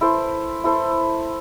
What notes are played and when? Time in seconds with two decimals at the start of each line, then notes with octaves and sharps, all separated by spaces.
0.01 E4 A4 C5
0.64 E4 A4 C5